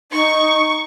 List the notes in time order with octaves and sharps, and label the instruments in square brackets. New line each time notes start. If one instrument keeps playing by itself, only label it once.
[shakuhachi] D#4 [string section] C#6